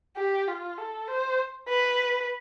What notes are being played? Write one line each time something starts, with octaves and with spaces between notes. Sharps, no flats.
G4
F4
A4
C5
B4